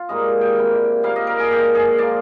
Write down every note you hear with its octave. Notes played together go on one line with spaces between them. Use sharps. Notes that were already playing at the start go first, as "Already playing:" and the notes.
Already playing: F4
G#2 D#3 G3 A#3 D#5
G5
C3 G3 A#3
A#2 G3 A#3 F5
D#5
A#4
G#4
A#2 G#3 G4
G#4
F3 A#3 D5